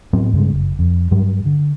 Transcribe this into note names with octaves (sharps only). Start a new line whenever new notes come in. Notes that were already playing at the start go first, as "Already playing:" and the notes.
A2 F#3 B3 C4
G2 C#3 G#3
F#1
F2
G2 F#3 G3
D3